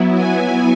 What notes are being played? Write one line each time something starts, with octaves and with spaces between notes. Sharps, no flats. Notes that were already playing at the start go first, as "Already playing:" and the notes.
Already playing: F#3 B3 E4
G#5